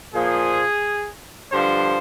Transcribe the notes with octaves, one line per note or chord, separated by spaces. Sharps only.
A#2 F3 G#4
G2 D3 F3 C5